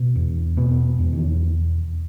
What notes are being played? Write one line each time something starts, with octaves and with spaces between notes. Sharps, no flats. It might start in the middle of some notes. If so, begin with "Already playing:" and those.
Already playing: B2 B3
E2
B2 B3
E2
D#3